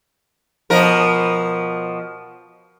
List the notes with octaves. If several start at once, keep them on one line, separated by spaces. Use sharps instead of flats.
B2 F3 A#4